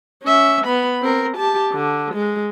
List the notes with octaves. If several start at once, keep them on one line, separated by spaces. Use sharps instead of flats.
C#4 E5
B3 B5
C4 A#4
G4 A5
D3
G#3